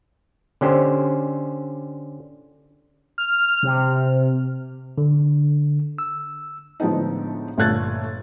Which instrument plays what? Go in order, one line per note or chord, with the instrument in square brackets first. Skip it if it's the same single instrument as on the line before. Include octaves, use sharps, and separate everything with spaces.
[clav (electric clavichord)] D3 C#4 G4 C5
[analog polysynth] F6
C3
[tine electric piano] D3
E6
[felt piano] A2 D3 F3 G#3 B3 D#4
G1 A#2 A3 F#6 G#6 A6